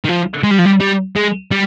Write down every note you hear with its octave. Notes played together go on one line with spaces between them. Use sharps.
D#3
F3
G#3
G3
F3
G3
G3
G#3
G3